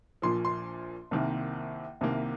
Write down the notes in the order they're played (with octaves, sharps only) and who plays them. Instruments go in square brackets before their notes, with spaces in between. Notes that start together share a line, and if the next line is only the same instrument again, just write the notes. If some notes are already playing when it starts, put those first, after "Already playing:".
[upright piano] A#1 A#2 F3 C6
C6
C2 C3 D#3 A#3
C2 C3 D#3 A#3